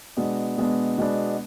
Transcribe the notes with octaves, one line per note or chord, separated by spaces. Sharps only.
B2 G#3 B3 D4
B2 G#3 B3 D4
B2 G#3 B3 D4